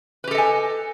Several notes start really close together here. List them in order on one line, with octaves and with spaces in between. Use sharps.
B4 G4 A4 D#5 G#5